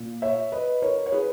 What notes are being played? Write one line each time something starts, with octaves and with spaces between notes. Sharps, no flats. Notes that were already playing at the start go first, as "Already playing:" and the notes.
Already playing: A#2
C#5 E5
B4 D#5
A#4 C#5
C#5
G#4 B4